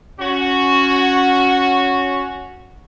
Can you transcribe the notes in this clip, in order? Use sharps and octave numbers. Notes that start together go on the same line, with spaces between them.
C#4 F#4